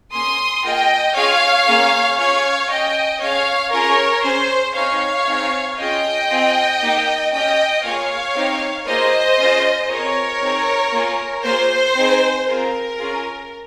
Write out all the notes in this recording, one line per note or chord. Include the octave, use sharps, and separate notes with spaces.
A#3 C#4 G#4 C6 D#6
A#3 F4 G#4 D#5 G5
C#4 F4 G#4 C#5 F5
A#3 C#4 G#4
C#4 F4 G#4 C#5 F5
C#4 G4 D#5 G5
C#4 G#4 C#5 F5
C#4 F4 G#4 A#4 C#5
C#4 G#4 C5
C4 D#4 G#4 C#5 F5
C4 D#4 G#4
C#4 F4 G#4 D#5 G5
C4 F4 G#4
A#3 D#4 G4
C#4 G4 D#5 G5
A#3 F4 G#4 C#5 F5
C4 D#4 G4
A#3 F4 G#4 C5 D#5
C#4 F4 G#4
C4 F4 G#4 A#4 C#5
C4 D#4 G#4
A#3 F4 G#4
A#3 F4 G#4 C5
C4 D#4 G#4
C4 F4 G#4 A#4
C#4 F4 G#4